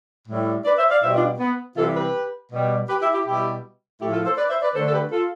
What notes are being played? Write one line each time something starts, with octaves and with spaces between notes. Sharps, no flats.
A2 G3
B4 D5
C5 E5
D5 F5
B2 G3 C5 E5
D4 F4
B3
C3 E3 G3 F4 A4
G4 B4
B2 G3
G4 B4
E4 G4
E4 G4
B2 G3 E4 G4
A2 F3 A3 E4 G4
F4 A4
A4 C5
B4 D5
C5 E5
B4 D5
D3 A3 A4 C5
A4
G4 B4
F4 A4